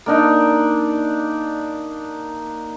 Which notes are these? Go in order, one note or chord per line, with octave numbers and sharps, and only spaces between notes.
A#3 D4 D#4